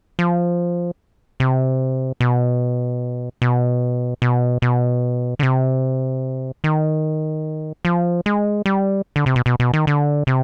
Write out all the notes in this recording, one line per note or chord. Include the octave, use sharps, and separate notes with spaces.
F3
C3
B2
B2
B2
B2
D3
C3
D#3
F3
G#3
G3
D3
C3
B2
B2
B2
D#3
D3
C3